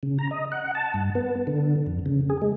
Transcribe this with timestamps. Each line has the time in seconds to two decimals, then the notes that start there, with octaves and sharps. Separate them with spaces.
0.03 C#3
0.19 A#5
0.31 D#5
0.52 F#5
0.75 A5
0.94 G2
1.15 B3
1.47 D3
1.86 F2
2.06 C#3
2.30 G#4
2.42 G#3